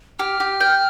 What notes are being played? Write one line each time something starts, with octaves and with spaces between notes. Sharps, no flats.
G4 F6
G4
G5